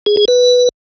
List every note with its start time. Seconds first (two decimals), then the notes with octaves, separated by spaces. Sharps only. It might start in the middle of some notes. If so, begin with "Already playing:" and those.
0.06 G#4
0.17 G#4
0.28 B4